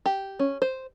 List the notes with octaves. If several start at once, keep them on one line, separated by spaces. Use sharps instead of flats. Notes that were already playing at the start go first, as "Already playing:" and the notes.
G4
C#4
C5